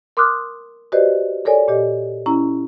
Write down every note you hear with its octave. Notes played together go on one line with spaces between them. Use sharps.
A#4 C6 D6 D#6 F6 F#6
F#4 G4 B4 C5 D5 D#5
A4 A#4 C#5 D5 G#5
A#2 G4 D#5
C#4 E4 A#5